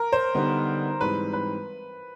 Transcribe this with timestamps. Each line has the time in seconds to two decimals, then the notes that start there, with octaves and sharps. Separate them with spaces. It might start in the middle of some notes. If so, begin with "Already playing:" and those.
Already playing: A#4
0.13 C5
0.34 D3 G3 B3 D#4
1.01 G#2 E3 G3 C4 B4
1.33 B4